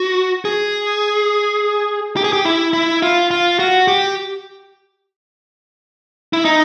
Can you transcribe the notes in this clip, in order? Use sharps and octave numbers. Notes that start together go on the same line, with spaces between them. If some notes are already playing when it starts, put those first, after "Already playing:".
Already playing: F#4
G#4
G4
G#4
G4
E4
E4
F4
F4
F#4
G4
E4
D#4